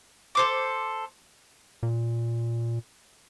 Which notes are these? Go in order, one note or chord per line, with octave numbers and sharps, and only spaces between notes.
A4 C5 D6
A#2